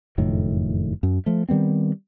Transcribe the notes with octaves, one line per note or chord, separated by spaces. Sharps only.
F#1 F2 A2 D#3
F#2
F3 A3
D#3 G3 B3 C4